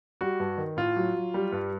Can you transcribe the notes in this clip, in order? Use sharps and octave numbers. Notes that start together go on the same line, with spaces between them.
G3 F#4
G2
D#3
A2 F4
F#3
F#3
G3
G2